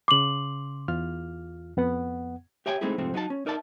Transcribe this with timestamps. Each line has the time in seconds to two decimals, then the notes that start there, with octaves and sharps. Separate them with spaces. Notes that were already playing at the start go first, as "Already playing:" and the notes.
0.08 C#3 C6 D6 F#7
0.88 E2 F4 F6
1.77 F2 B3 F#5
2.66 G4 C#5 E5 G5 G#5
2.81 G#3 A3 C4 D#4 E4 G#4
2.98 F2 G#2 C3 F3 A3 C4
3.14 F#3 D#4 A4 A5
3.30 C#4
3.46 D#4 A#4 D5 E5 A5